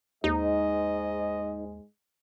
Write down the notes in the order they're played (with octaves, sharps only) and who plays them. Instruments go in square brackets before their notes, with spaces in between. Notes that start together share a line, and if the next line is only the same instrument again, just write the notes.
[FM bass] D#2 [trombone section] G#2 G#3 [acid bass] D#4 [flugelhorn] D#5